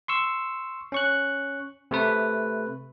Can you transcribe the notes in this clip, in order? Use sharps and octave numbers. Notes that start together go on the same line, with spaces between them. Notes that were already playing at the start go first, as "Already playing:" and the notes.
C6 C#6 E6
C#4 C#6 F#6
C3 A3 B4